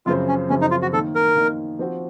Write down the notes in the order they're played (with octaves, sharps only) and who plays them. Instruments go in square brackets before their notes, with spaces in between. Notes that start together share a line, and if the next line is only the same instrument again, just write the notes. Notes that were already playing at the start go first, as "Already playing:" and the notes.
[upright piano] F#2 C#3 F3 C4 [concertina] F4
[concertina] C#4
[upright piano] F#2 C#3 F3 C4 [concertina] C#4
[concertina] D#4
F4
F#4
[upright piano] D#3 A#3 D#4 [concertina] A4
[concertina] A#4
[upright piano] D#3 A#3 D#4
F3 C4 F#4